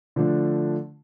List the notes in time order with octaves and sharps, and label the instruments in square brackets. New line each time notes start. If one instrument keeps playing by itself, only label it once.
[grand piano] D3 F3 A3 D4